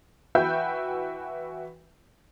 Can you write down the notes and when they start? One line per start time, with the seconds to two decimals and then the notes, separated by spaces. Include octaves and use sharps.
0.35 E3 F#4 B4 E5 G5 G6